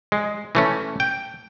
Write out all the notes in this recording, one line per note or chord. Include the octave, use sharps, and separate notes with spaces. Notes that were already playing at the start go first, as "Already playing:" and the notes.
G#3
E3 A3 C#4
G5